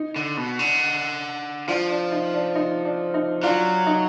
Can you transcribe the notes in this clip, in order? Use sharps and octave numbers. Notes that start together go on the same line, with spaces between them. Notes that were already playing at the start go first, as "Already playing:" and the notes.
Already playing: D#4
D3
B2
D3
F3 D4 F4
D4
D#4
D4
D#4
D4
D#4
F#3 D4 F4
D#4